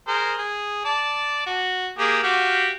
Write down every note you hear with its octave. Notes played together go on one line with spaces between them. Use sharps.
G#4 A#4 C5
G#4
D5 A5
F#4
A#3 G4 G#4
F#4 G4 F5